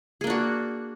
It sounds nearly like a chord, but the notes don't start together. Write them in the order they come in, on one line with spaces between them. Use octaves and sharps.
G#4 A#3 D4 F#4